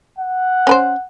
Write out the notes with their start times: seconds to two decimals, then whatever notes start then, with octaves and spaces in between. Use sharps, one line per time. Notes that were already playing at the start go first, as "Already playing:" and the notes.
0.19 F#5
0.67 C#4 B4 C5